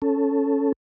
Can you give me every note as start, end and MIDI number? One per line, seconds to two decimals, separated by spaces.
0.02 0.73 61
0.02 0.73 69